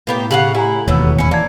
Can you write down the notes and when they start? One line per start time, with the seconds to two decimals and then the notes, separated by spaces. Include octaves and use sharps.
0.07 A2 A#3 B3 G4
0.31 C#3 G4 F5 F#5 F#7
0.55 E4 G4 G#5 A#5
0.88 E1 D#2 B2 B3 C#5 E6
1.18 C#4 E4 C#7
1.31 E3 A#3 D5 A5 G#6